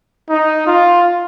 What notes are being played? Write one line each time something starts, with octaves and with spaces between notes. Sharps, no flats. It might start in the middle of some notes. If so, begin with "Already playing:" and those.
D#4
F4